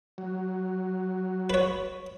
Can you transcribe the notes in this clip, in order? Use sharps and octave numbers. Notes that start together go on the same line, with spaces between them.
F#3
B4 C#5